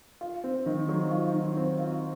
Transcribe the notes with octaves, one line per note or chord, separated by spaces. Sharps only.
F4
C4
D#3
F#3
F4
D#3
C4
F4